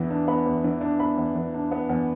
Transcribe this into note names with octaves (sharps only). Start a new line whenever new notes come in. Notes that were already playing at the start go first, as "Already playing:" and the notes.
Already playing: E2 E3 B3
D4
B3 B5
E2
E3
D4
B3 B5
E2
E3
D4
B3
E2